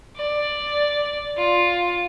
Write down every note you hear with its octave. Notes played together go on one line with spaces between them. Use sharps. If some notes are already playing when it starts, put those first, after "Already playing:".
D5
F4